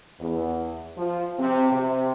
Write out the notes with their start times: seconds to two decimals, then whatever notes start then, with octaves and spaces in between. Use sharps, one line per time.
0.20 E2
0.97 F3
1.40 C3
1.72 C3